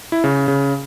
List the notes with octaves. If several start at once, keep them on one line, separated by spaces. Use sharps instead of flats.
E4
C#3
C#3